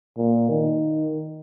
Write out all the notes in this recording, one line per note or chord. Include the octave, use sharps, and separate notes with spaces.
A#2
D#3